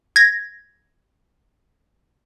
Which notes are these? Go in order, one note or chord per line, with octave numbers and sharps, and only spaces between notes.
G#6 A#6